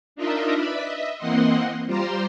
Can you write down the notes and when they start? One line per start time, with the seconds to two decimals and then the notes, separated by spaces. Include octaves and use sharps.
0.16 D4 D#4 F4 A#4 D#5 E5
0.53 B4 D5 E5 B5
0.82 D#5 E5
1.18 E3 A#3 C4 D#5 F#5 C6
1.86 G3 F4 G4 C5 A#5 C6